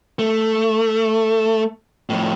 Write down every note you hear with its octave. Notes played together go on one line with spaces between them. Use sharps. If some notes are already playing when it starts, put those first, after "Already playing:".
A3
F2 A2